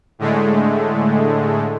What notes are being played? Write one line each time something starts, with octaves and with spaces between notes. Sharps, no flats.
A2 D3 G#3 A3